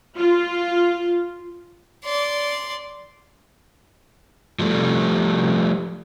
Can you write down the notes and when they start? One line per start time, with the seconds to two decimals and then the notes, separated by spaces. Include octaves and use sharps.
0.18 F4
2.04 D5 C6
4.59 F3 G3 A3